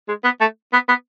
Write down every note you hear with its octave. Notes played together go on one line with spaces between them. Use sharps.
G#3
B3
A3
B3
B3